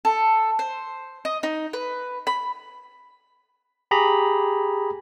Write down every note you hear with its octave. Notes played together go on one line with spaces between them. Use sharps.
A4
C5
D#5
D#4
B4
B5
G4 G#4 A#5 B5